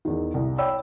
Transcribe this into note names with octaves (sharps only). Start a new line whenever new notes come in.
E2 D#3
C2
C#5 D5 G5 B5 E6